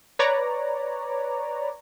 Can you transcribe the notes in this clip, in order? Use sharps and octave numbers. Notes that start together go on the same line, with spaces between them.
B4 C#5 D5 A#5